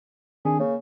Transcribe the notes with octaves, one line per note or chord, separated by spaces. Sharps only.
D#3 C4 D4 G#4
C#3 A#3